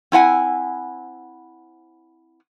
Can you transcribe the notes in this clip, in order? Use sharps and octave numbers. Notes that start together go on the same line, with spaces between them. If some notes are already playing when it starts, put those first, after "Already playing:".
C4 E4 F#5 G#5